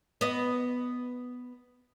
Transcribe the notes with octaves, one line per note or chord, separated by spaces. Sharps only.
B3 D#5